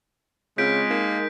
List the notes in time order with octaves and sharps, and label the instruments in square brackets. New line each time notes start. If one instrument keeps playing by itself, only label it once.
[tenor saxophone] C#3 [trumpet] G#3 [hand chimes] C4 F4 [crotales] G6 B6 D7
[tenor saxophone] A#3 [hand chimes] D#4 A#4